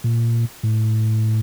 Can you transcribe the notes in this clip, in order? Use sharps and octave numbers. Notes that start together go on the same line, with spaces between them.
A#2
A2